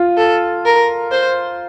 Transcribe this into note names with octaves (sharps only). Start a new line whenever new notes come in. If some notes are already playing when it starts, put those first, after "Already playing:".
Already playing: F4
A4
A#4
C5